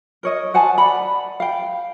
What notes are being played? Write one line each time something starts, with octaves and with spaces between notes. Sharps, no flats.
A#4 C#5 D#5
C5 F#5 G#5 A5
D5 F#5 B5
F5 G5